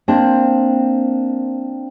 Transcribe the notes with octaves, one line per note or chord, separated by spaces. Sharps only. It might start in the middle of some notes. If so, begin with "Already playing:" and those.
A#3 C4 D4 C5